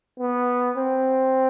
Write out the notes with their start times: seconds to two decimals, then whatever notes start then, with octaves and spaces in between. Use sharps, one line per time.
0.19 B3
0.77 C4